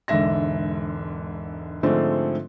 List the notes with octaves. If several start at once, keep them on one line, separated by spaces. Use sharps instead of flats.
E1 G#2 D3 E5 A#6
G#2 D3 F3 G#3 A3 C4